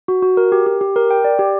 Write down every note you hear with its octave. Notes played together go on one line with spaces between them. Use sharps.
F#4
F#4
A#4
G4
G4
G4
A#4
G5
D5
G4